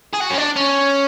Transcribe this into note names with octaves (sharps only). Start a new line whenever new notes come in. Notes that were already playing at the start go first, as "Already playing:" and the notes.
G#4
F#4
C#4
D4
C#4